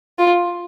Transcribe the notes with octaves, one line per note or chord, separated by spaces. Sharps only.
F4